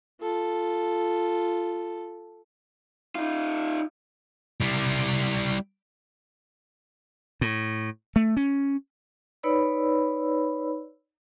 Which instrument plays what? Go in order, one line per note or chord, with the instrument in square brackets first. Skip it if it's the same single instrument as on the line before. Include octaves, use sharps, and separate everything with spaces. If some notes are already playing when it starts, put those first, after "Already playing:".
[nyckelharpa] F4 A4
[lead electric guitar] D#4 F4
[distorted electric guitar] G3 E4
[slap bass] A2
A3
C#4
[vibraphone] D#4 B4 C#5 D5 B5 E6